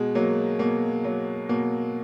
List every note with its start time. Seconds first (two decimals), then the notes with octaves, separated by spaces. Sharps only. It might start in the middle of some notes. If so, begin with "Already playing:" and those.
Already playing: B2 G#3
0.15 F#3 A#3
0.59 B2 A#3
1.04 F#3
1.49 B2 A#3